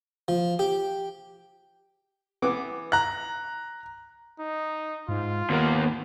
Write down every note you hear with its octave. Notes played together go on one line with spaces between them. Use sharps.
F3
G4
E3 B3 D6
A#5 F#6
D#4
G#2 F4
D#2 A#3 B3